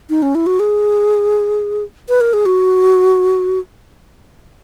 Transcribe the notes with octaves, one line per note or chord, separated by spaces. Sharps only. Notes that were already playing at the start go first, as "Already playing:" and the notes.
D#4
C#4
E4
F#4
G#4
B4
A#4
G#4
F#4